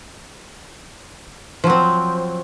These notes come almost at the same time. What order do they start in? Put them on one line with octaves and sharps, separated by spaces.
F3 F#3 C4